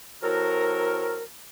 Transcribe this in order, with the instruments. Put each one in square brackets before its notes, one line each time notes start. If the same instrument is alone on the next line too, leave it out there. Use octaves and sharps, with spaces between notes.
[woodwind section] F#3 C4 E4 F#4 A4 A#4